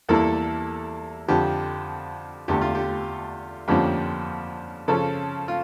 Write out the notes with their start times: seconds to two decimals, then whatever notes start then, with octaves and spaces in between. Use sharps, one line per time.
0.09 E2 E3 G3 A#3 E4 A4
1.28 F2 D3 F3 G4
2.48 E2 D3 A3 G4
2.61 F4
2.75 G4
3.68 F2 D3 F3 A#3 C#4 G4
4.88 C#3 F3 C#4 A4
5.48 F4